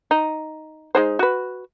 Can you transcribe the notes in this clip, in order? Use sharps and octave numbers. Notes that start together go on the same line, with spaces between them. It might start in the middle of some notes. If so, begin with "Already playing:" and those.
D#4
G#3 D#4 C5
F#4 B4